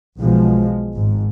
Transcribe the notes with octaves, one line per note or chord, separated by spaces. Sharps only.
B1 B2 F3 G#3
G#1 G#2